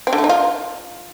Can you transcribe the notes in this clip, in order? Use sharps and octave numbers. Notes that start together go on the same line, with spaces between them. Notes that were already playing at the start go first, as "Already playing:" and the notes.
C4
D3
A3
D#4
F4